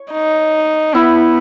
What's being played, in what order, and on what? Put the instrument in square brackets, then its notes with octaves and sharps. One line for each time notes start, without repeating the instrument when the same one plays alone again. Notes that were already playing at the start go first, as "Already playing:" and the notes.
Already playing: [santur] C#5
[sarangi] D#4
[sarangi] B3 [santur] E4